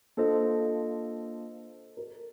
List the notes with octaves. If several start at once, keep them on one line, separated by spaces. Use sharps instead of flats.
A#3 D4 F4 A4 C5 D#5
A#4